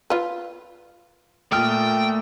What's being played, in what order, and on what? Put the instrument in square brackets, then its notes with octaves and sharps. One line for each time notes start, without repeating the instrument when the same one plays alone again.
[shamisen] F4 B4
[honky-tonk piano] A#2 D#6 [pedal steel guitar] A3 F6 [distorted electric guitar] G5